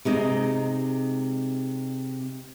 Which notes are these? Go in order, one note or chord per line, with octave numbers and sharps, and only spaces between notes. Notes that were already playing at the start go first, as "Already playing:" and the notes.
C3 G#3 D#4